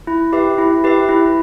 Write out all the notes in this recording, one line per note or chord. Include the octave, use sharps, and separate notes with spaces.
E4
G4 B4 E5
E4
G4 B4 E5
E4